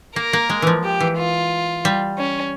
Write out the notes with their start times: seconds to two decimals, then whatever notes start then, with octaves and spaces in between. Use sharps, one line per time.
0.16 A#3 A#4
0.33 A#3
0.49 G#3
0.62 E3 F3
0.84 G4
1.00 E3
1.18 F4
1.85 G3
2.18 C#4